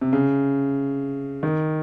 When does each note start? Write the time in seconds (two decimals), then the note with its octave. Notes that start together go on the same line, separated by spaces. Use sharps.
0.01 C3
0.13 C#3
1.43 D#3